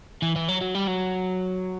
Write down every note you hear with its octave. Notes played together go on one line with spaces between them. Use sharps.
E3
E3
F#3
F#3
G3
F#3